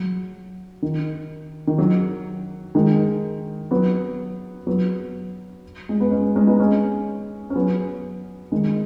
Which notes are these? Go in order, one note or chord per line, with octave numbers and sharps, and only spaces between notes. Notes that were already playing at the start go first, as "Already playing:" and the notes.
Already playing: F#3
D#3
D#3
F#3
D#3 G#3
F#3 B3
F#3 B3
G#3
B3
G#3 C#4
G#3 C#4
B3 D#4
G#3 C#4
C#4
F#3 B3
D#3 G#3